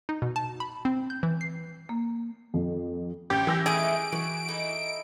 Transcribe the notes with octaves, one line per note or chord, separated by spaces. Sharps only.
D#4
B2
A5
B5
C4
G6
E3
C7
A#3
F2
A1 G4 G6
E3 E6 A#6
D#3 A3 E4 G#4 D7
E3 F#4
D#4 E4 A4